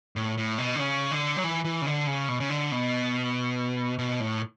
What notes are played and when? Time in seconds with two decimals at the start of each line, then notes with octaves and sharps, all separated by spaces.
0.16 A2
0.38 A2
0.58 B2
0.75 D3
0.79 C#3
1.11 D3
1.37 F#3
1.44 E3
1.64 E3
1.82 C#3
1.86 D3
2.07 C#3
2.29 B2
2.40 C#3
2.50 D3
2.72 B2
3.99 B2
4.20 A2